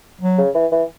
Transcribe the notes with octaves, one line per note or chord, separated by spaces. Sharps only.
F#3
C#3
E3
E3